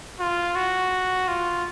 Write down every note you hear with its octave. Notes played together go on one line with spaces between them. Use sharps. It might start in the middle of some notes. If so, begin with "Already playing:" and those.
F4
F#4
F4